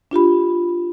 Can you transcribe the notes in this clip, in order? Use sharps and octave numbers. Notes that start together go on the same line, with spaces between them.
D4 F4 G4 B5